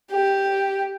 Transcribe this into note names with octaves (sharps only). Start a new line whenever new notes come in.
G4